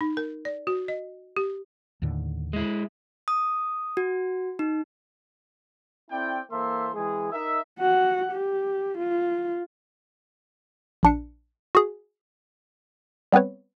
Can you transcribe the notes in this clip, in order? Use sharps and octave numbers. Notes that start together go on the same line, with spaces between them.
D#4
A#4
D5
F#4
D#5
G4
D#2 A2 D3
G#3 E4
D#6
F#4
D#4
C4 E4 A4 D5 G5
E3 A#3 A4 C5 E5 C6
E3 G#3 C4 G#4
D#4 A#4 D#5 E5
F#4 F#5
G4
F4
A#1 D4 C#7
F#4 G#4
G3 B3 C4 B4 C#5